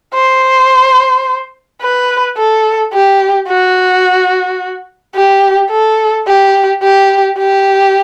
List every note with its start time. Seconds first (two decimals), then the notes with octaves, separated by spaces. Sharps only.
0.14 C5
1.82 B4
2.37 A4
2.93 G4
3.48 F#4
5.16 G4
5.71 A4
6.27 G4
6.83 G4
7.38 G4